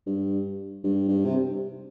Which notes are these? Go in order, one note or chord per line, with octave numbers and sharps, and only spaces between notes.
G2
G2
G2
C3